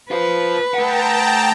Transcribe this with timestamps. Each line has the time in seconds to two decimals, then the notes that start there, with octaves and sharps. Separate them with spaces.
0.11 F4 B4 C5
0.74 A3 F#5 G5 A5 A#5